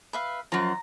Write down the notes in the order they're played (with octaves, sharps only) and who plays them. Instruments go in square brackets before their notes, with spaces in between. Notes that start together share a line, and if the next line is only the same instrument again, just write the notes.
[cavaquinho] B4 E5 F5
[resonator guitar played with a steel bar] F#2 F3 [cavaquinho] A#5